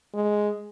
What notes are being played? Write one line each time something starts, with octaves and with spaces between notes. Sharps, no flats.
G#3